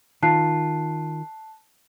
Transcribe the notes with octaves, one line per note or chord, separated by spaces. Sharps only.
D#3 F4 A5 F#6 C7